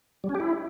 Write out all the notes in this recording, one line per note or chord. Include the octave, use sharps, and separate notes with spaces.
G3
C#4
G4
E4